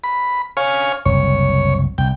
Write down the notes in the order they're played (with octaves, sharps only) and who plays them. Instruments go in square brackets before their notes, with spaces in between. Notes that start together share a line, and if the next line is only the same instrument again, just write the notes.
[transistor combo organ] B5
C#5 F5 G#5
[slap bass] F#1 C2 [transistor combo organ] C#5
[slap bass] C2 [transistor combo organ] G5